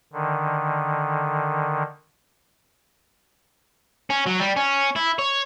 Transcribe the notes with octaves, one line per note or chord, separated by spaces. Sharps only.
D3 D#3
C#4
F#3
G3
C#4
E4
C#5